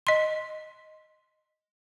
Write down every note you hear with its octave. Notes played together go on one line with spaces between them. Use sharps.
D#5 C6